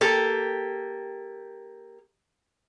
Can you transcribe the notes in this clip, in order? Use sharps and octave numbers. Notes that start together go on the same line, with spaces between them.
A#3 G4 A4